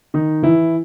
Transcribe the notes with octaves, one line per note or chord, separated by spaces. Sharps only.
D#3 D#4
E3 E4